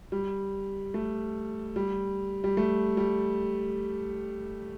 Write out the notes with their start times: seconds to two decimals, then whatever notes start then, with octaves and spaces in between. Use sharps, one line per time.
0.12 G3
0.94 A3
1.76 G3
2.44 G3
2.57 A3
2.97 G3